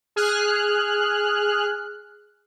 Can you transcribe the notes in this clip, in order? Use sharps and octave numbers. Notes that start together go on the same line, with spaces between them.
G#4 F6 F#6